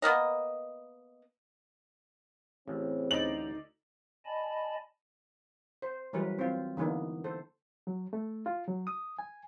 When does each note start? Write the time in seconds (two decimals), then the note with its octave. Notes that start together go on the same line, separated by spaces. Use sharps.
0.02 A#3 B3 A#4 D#5
2.68 A1 C#3 E3 C4
3.11 D2 D#4 D5 F#7
4.25 D5 D#5 G#5 A5 B5
5.82 C5
6.13 E3 F#3 G3 A#4 B4
6.39 C4 F4
6.77 D3 E3 A#3 B3 D#4
7.24 A4 C5
7.87 F#3
8.13 A3
8.46 F4
8.68 F#3
8.87 D#6
9.19 G#5